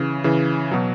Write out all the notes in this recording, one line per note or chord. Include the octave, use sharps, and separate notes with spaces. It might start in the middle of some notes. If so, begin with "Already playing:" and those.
Already playing: C#3 E3
C#3 E3
B2 F#3